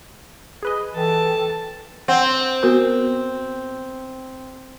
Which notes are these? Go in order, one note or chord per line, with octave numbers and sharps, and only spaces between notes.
G#4 B4 D#5
E3 A4 G5 A5
C4 F#5
B3 F#4 A#4